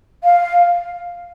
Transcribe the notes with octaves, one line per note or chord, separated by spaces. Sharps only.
F5